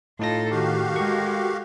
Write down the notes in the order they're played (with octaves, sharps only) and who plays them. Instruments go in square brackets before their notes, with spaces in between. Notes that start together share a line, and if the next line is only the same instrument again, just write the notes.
[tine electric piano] A2 D#4 A#6 [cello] F4 A4
[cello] D#3 [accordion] F#4 G4 F5
[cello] G#3 [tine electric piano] A4 A#4 C#6